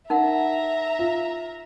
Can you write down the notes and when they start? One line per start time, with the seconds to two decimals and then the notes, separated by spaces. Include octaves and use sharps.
0.10 D#4 A#4 E5 F#5 A#5
0.99 F4